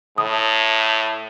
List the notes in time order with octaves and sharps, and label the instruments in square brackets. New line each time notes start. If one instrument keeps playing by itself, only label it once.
[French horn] A2 [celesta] D#6